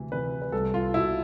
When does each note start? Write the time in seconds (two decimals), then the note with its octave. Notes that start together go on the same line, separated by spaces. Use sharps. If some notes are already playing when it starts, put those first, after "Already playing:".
Already playing: D2 C3 E3
0.11 C3 E3 B4
0.42 B4
0.52 C2 A4
0.74 F4
0.94 B2 E4